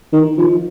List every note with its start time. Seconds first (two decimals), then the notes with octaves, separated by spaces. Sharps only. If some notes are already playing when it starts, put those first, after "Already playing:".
0.13 D#3
0.38 F3